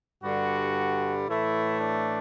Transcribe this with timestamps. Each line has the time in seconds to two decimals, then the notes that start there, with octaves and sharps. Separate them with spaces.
0.23 G2 D3 G3 F#4
1.28 A2 E3 A3 E4
1.80 D4